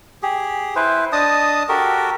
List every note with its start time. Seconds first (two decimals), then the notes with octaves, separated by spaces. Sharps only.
0.23 G4 G#4
0.76 E4 B4 C5
1.12 D4 D#5 A5 D#6
1.69 F#4 G4 A4 A#4